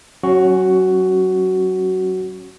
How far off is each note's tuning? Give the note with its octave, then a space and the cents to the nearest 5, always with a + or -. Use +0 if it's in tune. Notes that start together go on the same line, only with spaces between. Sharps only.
F#3 +20 C#4 -15 F#4 +10